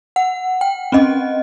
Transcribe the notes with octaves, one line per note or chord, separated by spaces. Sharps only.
F#5
G5
C4 C#4 D#5